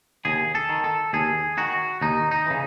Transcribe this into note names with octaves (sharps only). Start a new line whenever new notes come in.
D#2 G#4
A4
D#3
A4
D#2 G#4
D#3 F#4
D#2 D#4
D#4
C#3 E3